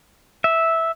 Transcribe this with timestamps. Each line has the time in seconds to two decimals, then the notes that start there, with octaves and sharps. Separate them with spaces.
0.44 E5